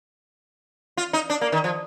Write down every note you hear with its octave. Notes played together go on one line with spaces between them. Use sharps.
F4
D#4
D4
A#3
D#3
F3